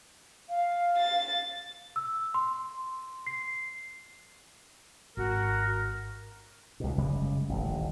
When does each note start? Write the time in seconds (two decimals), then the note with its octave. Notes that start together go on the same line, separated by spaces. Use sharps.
0.49 F5
0.98 A6
1.96 E6
2.34 C6
3.27 C7
5.17 G#1 F#4 A#4
6.80 C#2 B2
6.98 F#1 C#3 G3 G#3
7.49 D#1 A1